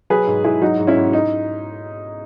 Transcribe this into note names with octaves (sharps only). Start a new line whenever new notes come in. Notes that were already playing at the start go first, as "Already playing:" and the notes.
F#3 G#4 B4
G#2
G#2 E4 G#4
F#3 D#4 F#4
G#2
C#4 E4
G#2
D#4